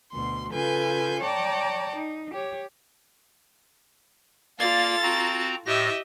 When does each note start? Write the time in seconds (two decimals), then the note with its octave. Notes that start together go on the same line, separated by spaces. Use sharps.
0.12 D2 B2 C6
0.51 C#3 F4 A4 B4 G#5 G6
1.21 C#5 D5 G5 A5 A#5 D6
1.95 D#4
2.33 G4 C#5
4.59 A#3 F4 A4 D5 F5 A6
5.03 C4 F#4 A#5
5.66 A2 G4 D#5 E5 A#6